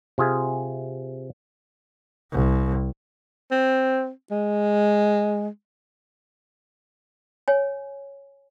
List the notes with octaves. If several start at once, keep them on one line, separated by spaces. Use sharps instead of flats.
C3 F4 G#4
C2
C4
G#3
C#5 G#5